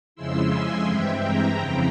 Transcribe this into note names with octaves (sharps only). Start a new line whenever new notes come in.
F2 C#3 F3 G#3 E4 C6 E6
G#5 C6
G2 E3 G#3 C4 E5 G5
G5 A#5
F2 C#3 F3 C4 E4